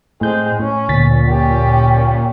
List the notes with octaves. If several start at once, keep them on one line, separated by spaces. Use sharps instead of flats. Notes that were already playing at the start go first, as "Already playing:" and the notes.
A2 G#3 C4 G6
A2 C#4
D2 A#2 A6 B6
C#4 G4